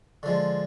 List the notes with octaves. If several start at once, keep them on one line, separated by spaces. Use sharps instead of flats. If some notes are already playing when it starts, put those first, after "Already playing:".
D3 F3 G#3